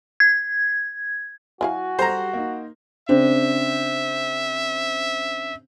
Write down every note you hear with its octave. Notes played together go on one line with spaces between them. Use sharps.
G#6
F#3 E4 F#4 F5 G#5
G3 G4 A4 C5 A#5
A#3 D#4
C#3 C4 D4 E5